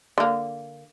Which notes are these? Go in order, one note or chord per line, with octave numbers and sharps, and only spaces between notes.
D3 A#3